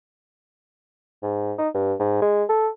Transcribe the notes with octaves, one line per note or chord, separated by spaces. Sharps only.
G#2
D#4
G2
G#2
G#3
A4